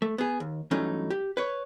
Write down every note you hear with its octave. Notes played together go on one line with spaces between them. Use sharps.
A3
B3 G#4
D#2
G2 E3 F#3 A3 C#4 D#4
G4
B4 C#5